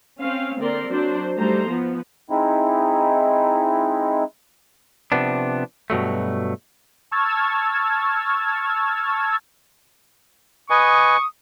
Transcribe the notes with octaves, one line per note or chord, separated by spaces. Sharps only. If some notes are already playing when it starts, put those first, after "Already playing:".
C4 C#4 F5
D3 A#3 C4 A#4 D5 C6
F#3 D4 C5
G3 A3 D#4 C5 A#5
F3 B3
G#3 C4 D#4 E4
C3 F3 B3 D4
G2 B2 F#3 A3
A5 C#6 E6 F6 G#6 A6
B4 D#5 G#5 C#6 D#6